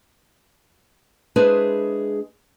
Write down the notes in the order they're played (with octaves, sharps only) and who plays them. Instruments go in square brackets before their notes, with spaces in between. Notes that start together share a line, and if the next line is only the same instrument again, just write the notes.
[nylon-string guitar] G#3 D4 E4 G#4 B4 C5